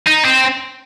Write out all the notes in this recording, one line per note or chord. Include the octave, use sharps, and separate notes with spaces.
D#4
C4